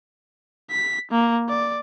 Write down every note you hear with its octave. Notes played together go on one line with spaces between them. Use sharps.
B6
A#3
D5